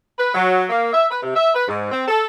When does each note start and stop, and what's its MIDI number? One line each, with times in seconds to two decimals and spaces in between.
0.18 0.31 71
0.34 0.65 54
0.69 0.92 58
0.93 1.08 76
1.10 1.23 71
1.23 1.33 48
1.36 1.53 76
1.54 1.66 71
1.68 1.90 44
1.92 2.05 60
2.08 2.26 69